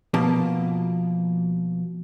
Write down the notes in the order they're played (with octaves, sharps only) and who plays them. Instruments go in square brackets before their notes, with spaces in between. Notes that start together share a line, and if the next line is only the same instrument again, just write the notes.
[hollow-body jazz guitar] B2 F3 A#3 A5